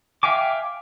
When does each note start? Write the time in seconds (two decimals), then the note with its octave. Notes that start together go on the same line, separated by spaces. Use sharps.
0.23 E5 F5 G5 G#5 D6